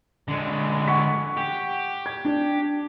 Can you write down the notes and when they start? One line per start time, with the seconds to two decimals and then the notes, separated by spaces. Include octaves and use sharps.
0.28 D3 G#3
0.87 F#5 C#6 B6
1.37 G4
2.06 G#6
2.25 D4